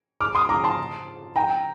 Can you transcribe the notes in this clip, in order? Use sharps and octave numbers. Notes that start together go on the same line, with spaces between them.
D6 F6
C6 D#6
A#5 D6
A5 C6
G5 A#5